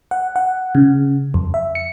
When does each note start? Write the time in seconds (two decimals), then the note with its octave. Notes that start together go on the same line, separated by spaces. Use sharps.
0.11 F#5
0.36 F#5
0.75 C#3
1.34 F2
1.54 E5
1.75 C#7